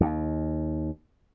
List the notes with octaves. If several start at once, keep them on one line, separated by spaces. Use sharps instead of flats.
D#2